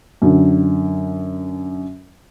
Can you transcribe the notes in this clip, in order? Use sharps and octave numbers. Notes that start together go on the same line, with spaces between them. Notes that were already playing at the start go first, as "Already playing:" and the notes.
F#2 D3